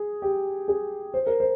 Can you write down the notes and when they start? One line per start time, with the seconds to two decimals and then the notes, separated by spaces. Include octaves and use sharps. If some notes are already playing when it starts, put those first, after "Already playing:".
Already playing: G#4
0.22 G4
0.68 G#4
1.14 C5
1.27 A#4
1.40 C5